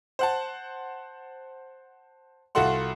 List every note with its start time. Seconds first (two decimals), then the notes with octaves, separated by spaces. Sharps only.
0.19 C5 F#5 A5
2.55 C2 F4 F#4 A4 F#5 C6